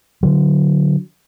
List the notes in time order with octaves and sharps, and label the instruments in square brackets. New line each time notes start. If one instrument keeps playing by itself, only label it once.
[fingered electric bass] D3 F#3